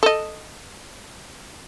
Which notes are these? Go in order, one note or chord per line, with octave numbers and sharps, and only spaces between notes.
A4 D#5